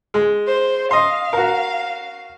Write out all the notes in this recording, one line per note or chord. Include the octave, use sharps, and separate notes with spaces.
G#3
C5
D#5 F5 C6
F#4 A#4